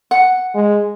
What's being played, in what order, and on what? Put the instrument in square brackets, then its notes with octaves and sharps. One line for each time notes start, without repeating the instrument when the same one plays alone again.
[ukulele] F#5
[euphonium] G#3